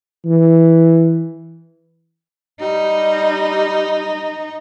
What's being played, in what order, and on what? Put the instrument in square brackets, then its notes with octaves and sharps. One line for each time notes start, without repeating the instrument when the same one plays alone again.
[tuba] E3
[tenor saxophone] G3 [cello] D#4